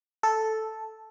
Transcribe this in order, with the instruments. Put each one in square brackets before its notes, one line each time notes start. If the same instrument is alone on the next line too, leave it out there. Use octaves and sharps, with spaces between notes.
[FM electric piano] A4